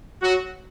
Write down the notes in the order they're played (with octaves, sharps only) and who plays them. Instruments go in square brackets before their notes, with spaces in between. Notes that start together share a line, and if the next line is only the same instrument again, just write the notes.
[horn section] F#3 F#4